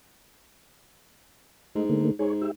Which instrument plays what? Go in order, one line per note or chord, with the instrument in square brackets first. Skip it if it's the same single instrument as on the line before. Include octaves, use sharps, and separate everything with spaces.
[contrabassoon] G#2 [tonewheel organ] A3 D#4
[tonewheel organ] D3 A3 A#3
[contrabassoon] G#2 [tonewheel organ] G#4 C#5
[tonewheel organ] G4 E5